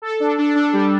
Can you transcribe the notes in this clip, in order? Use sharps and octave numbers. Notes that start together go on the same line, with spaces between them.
A4
D4
D4
D4
G3